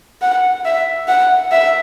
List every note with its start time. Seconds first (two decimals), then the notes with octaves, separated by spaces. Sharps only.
0.22 F#5
0.65 E5
1.08 F#5
1.52 E5